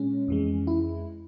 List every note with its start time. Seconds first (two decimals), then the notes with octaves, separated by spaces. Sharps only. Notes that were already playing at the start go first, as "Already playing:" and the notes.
Already playing: A#2 G#3 C#4
0.28 F2 E3 G#3
0.67 E4